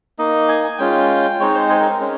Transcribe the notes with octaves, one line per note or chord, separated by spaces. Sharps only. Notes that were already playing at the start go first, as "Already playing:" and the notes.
A#3 D#4 D#5
G#5
G#5
G#3 C#4 F4 G5
G#3 C4 D#4 C#5
C5
G#4
A#4
A#4
G#3 C#4